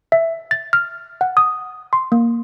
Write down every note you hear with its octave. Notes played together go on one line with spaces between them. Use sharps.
E5
A6
F6
F#5
D#6
C6
A#3